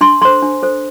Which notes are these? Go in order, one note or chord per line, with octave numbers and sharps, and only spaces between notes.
D4 C6
A4 C5 C6
D4
A4 C5